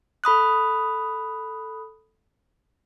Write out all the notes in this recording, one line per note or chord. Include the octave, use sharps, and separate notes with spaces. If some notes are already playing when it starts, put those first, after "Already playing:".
A4 B5 D#6 F#6